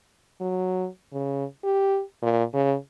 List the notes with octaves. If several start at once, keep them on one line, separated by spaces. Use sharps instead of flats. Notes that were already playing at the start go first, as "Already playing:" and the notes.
F#3
C#3
G4
A#2
C#3